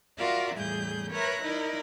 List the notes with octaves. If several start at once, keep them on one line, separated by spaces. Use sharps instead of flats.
F4 F#4 A#4 D5 E5 F5
E2 A2 G3 G#4 G6
A#4 B4 C#5 E5 A#5 F#6
D#4 E4 A#4 D5